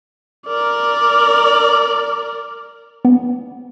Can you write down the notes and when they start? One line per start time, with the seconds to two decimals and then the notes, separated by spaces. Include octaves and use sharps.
0.47 A#4 D5
3.05 B3